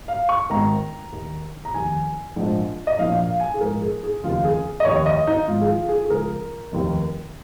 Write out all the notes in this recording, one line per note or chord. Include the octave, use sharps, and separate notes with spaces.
F5
C#6
G#1 G#2 D#3 A#5
D#2 D#3
A#5
F1 D#2 D#3 G#5
A#1 G#2 F3
D#5
A#1 A#2 F3 F5
F5
G#5
G#4
A#1 G#2 F3 A#4
G#4
G#4
F1 D#2 C#3 F3 F4
G#4
D#5
F1 D#2 D#3 C#5
D#5
D#4
G#1 G#2 F3 F4
G#4
F4
G#4
G#4
C#2 C#3 F3 A#4
F1 D#2 D#3